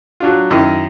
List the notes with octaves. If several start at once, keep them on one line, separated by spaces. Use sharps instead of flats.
F#3 D4 F4
F#2 D#3 E4 D#5